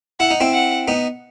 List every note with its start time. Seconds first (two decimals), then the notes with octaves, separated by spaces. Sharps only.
0.20 E4 F#5
0.31 D#4
0.40 C4 E4
0.53 F#5
0.88 B3 D#4